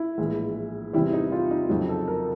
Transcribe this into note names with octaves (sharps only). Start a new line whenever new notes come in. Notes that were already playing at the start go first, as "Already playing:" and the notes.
Already playing: E4
A#1 A2 E3 G#3
E2 C3 E3 G3 E4
D#4
F4
D#4
F2 C#3 F#3 D#4
A4
A#4